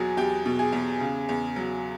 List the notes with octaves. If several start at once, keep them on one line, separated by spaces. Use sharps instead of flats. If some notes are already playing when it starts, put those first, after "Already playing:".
Already playing: E2 B2 F#3 G#4
E2 G4
B2
G#4
E2
C#3
E2
F#3